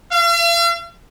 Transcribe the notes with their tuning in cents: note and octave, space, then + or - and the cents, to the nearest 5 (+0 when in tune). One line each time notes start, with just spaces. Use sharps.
F5 -45